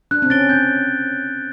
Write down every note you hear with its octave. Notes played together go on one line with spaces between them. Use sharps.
D4 F#6
C4
C#4 A6 D7 G7
C4 G6